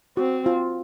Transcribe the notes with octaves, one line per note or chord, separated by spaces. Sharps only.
C4 F#4
F4